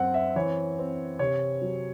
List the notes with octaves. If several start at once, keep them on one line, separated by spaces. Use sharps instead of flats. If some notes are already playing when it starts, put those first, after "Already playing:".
Already playing: F#2 C4 F#5
E5
E3 C#5
C4
C3 C#5
F#3